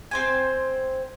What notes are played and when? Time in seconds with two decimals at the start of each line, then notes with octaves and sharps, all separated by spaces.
0.11 C4 C5 G#5